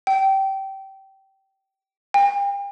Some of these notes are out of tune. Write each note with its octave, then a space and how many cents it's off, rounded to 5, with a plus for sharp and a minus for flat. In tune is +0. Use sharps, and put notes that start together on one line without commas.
G5 -20
G5 +40